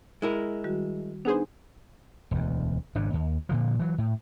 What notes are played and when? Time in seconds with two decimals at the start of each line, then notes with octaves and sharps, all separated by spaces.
0.22 G#3 E4 A#4
0.64 D#3 G3 F#4
1.25 B3 D4 D#4 G#4 C5
2.31 E1 D2
2.95 G#1 G#2 C#3 D4
3.14 D#2
3.49 A#2 D3 F3
3.79 E3 F#3
3.98 A2